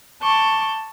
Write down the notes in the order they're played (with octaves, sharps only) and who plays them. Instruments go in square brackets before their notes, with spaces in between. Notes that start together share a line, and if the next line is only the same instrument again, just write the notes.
[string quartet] A5 C#6 D6 G6